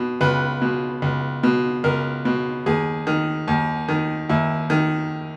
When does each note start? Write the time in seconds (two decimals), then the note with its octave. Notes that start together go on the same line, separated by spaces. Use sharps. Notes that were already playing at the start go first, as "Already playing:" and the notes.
Already playing: B2
0.21 C#2 B4
0.62 B2
1.02 C#2
1.43 B2
1.84 C#2 A#4
2.25 B2
2.66 D#2 G#4
3.07 D#3
3.48 D#2
3.89 D#3
4.29 D#2 E4
4.70 D#3